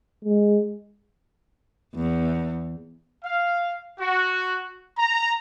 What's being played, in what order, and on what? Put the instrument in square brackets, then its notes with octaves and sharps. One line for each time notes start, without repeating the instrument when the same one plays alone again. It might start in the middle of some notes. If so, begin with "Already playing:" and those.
[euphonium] G#3
[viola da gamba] E2
[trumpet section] F5
F#4
A#5